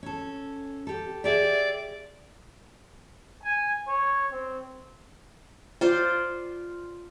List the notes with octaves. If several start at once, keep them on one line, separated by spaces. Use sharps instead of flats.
C#4 A4
G4 A4
G4 G#4 D5 E5
G#5
C#5
C4
F4 C5 D5